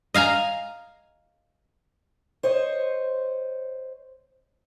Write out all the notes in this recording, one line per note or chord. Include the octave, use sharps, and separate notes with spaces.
D#5 F5 G#5 A#5
C5 C#5 D#5